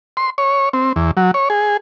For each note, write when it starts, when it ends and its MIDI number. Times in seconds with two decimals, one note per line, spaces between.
0.17 0.30 84
0.38 0.69 73
0.73 0.93 60
0.96 1.11 40
1.17 1.31 54
1.34 1.49 73
1.50 1.77 68